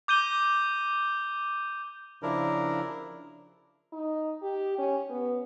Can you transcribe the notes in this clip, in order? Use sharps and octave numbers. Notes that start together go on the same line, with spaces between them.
D6 G6 D#7 G7
C#3 F3 D4 E4 A#4
D#4
G4
C#4
B3